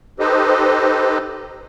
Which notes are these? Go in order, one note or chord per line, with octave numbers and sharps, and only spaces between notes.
D#4 G4 A4 B4 C5 D#5